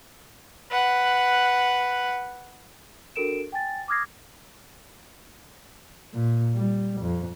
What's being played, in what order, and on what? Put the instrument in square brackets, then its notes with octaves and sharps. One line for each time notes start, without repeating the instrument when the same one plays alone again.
[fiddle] B4 F#5
[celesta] D4 F#4 A4 A#4 D7 E7
G5 G#5 A6
D6 D#6 F6 G#6 A#6 C7
[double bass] A#2
G3
F2